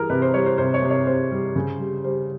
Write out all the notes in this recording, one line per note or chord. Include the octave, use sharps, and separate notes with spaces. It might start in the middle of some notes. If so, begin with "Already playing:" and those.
Already playing: E3 G3 G#4 A#4
C3 B4
C5
G3 C#5
C5
C3 C5
C#5
C3
C#5
C3 C5
G3
C#3
G3
G3 C5